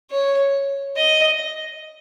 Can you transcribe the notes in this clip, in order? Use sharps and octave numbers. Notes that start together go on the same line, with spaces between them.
C#5
D#5